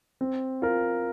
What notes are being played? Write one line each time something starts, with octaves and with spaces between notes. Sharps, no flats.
C4
F4 A#4